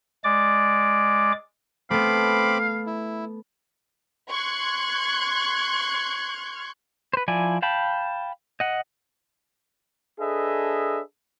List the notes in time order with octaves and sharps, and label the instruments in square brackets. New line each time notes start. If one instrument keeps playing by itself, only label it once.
[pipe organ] G#3 D5 D6
[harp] A3 B3 [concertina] C4 B5 D6 [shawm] F5
[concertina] E4
[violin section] C6 C#6 F#6 G#6
[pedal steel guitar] B4 C5
F3 E4 D5 G#5
F5 G5 A5 B5
D#5 F#5
[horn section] D4 G#4 A4 B4 D#5 E5